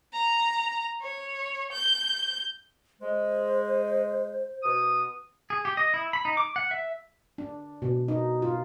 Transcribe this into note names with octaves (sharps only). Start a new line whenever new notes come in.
A#5
C#5
G6
G#3 C5
B2 D#6
G#4
G4
D#5
E4
B5
D#4
D6
F#5
E5
D4
B2
D#4
F4